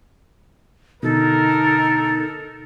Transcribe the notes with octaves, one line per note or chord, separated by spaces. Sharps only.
B2 D3 D#4 A4 A#4